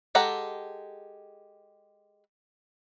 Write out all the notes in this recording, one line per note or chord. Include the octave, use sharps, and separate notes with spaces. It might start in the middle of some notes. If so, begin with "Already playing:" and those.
G#3 G4 A4 F#5 A#5